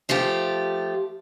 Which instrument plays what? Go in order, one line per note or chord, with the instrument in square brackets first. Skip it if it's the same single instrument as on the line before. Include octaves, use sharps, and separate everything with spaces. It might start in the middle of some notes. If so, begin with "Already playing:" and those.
[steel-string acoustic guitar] F3 A3 F4 G4